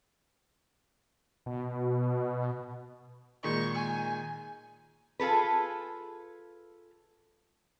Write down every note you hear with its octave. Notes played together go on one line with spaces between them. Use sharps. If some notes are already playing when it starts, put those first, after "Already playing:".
B2
A#2 D#3 G#3 C#6
G#5
F4 G#4 A4 B4